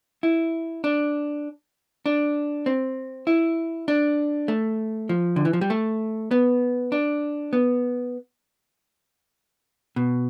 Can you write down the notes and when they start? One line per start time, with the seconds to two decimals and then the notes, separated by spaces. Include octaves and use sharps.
0.23 E4
0.84 D4
2.06 D4
2.66 C4
3.27 E4
3.88 D4
4.48 A3
5.09 F3
5.36 D3
5.45 E3
5.53 F3
5.61 G3
5.70 A3
6.31 B3
6.92 D4
7.53 B3
9.96 B2